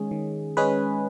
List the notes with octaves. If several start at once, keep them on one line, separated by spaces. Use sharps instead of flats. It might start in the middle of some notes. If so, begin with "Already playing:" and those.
Already playing: D#3 G#3 C#4 G#4
D#3
G#3 C#4 G#4 B4